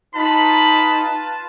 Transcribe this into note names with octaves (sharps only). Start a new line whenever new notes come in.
D#4 F4 B4 A5 B5